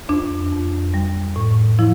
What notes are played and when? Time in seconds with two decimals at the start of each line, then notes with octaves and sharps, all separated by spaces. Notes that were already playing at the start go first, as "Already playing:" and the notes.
0.09 F2 D4
0.52 F2
0.94 G3
1.36 A2
1.79 F3 E4